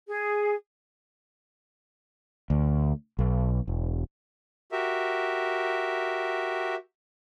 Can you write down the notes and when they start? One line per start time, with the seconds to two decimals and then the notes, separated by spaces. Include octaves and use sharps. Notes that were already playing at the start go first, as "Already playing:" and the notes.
0.08 G#4
2.50 D2
3.19 B1
3.68 E1
4.72 F#4 G4 A#4 E5